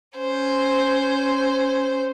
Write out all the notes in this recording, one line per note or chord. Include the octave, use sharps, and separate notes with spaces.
C#4 C5